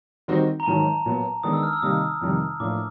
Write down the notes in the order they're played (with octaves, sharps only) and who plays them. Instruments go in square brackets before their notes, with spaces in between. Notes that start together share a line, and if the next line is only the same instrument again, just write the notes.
[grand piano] D#3 G3 C4 D#4 F#4
[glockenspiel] A#5
[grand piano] G#2 D#3 F#3 [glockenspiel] A5
[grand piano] A#2 F#3 B3
[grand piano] D#3 G#3 B3 D4 [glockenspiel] D#6
[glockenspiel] E6
F6
E6
[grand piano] C3 D#3 G3 A#3 D#4 [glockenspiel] D#6
[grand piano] F2 C3 D#3 G3
[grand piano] A2 F3 A#3 D4 [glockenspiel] D6